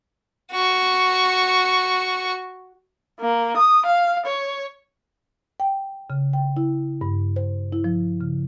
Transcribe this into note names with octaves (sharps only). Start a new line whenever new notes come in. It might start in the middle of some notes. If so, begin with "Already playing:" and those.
F#4 C#6
A#3
D#6
F5
C#5
G5
C#3
G5
E4
G2
C5
E4
F3
C#3